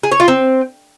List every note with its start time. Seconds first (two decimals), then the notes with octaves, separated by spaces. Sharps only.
0.03 G#4
0.12 C#5
0.20 F4
0.28 C4